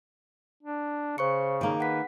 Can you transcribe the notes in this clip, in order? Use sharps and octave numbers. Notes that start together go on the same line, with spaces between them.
D4
C#3 C5 C#6 C#7
D#3 A#3 G#4
B4 F#5 B6